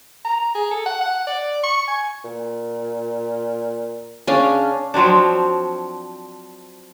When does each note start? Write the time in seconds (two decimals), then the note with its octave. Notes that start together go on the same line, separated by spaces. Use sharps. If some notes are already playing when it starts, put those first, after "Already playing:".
0.25 A#5
0.55 G#4
0.71 A4
0.86 F#5
1.01 F#5
1.27 D5
1.64 C#6
1.87 G#5
2.25 A#2
4.27 C#3 C#4 D4 F5
4.94 F3 F#3 C4 D4